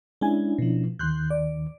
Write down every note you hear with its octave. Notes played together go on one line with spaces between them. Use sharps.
G#3 C#4 D4 E4 G#5
B2 F3
D#2 D#3 C6 F#6 G6
D5